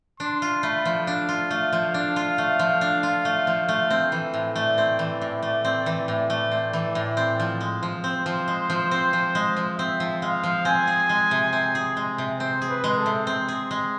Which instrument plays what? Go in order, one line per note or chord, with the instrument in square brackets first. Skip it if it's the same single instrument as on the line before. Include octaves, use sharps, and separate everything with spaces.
[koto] D4 [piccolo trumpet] C6
[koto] F4
[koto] A3 [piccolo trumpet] B5
[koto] F3
[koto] D4 [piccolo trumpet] F5
[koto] F4
A3
F3
D4
F4
A3
F3
D4
F4
A3
F3
A3
C4
E3
A2
[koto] A3 [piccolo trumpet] D5
[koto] C4
E3
A2
A3
C4
E3
A2
A3
C4
E3
A2
C4
F3
G#3
F3
[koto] C4 [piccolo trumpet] C5
[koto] F3
G#3
F3
C4
F3
G#3
F3
[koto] C4 [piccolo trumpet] E5
[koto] F3
[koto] G#3 [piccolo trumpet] F5
[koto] F3
[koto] C4 [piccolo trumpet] G#5
[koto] G#4
G#3
C3
C4
G#4
G#3
C3
[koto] C4 [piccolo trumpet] C5
[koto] G#4
[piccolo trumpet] B4
[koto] G#3
[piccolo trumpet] A4
[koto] C3
C4
G#4
G#3